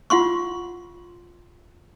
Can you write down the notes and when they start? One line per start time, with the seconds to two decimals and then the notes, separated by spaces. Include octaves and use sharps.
0.10 F4 F#5 C6 C#6